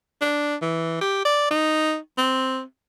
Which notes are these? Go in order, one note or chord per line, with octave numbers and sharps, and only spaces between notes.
D4
E3
G4
D5
D#4
C4